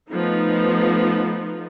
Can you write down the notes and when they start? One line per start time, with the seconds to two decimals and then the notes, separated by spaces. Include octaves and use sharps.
0.10 F3 A3 B3 D#4